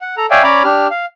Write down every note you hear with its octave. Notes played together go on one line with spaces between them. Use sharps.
F#5
A4 A#5
C#5 D5 E5 F5 G5 G#5
C#4 C#5 D5 A#5 B5 D6
D4 G4 F6
F5